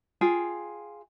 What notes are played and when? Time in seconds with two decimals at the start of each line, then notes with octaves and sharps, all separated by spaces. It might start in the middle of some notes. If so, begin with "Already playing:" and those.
0.21 F4 G#4 G5